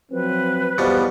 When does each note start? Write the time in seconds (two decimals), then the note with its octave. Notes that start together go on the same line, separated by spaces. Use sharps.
0.11 F3 F#3 C4 B4
0.78 E2 B2 E3 F3 G3